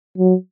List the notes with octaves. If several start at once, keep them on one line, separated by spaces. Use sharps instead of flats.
F#3